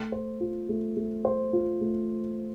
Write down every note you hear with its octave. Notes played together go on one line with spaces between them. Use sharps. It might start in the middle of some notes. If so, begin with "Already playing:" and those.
Already playing: A3
C5
F4
A3
A3
C5
F4
A3